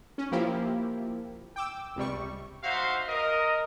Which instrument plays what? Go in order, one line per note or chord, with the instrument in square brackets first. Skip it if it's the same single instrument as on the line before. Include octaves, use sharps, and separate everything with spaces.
[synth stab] C#4
F3 A#3 E4 G4
G5 D6 E6
C#2 C3 G3 C#6
[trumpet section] D#4 F#4 C5 E5 F5
A#4 D#5